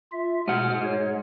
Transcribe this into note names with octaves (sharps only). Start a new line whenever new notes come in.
F4 E5
G#2 B2 F#5 F6
C#5